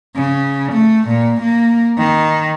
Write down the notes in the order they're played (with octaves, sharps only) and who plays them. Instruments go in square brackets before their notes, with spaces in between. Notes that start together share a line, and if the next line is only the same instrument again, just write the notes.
[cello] C#3
A3
A#2
A#3
D#3